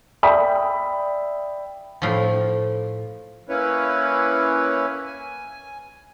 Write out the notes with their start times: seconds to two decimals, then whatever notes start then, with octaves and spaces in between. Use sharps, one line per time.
0.23 D5 E5 G5 B5 D#6
2.02 A2 F3
3.49 A#3 C#4 E4 B4 C#5
5.06 G#5